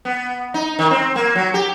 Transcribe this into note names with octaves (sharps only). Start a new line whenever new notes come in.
B3
D#4
D#3
C4
A#3
F#3
G4